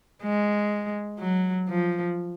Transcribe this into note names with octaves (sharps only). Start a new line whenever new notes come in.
G#3
F#3
F3